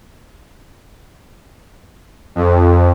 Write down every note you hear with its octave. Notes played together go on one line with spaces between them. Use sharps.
F2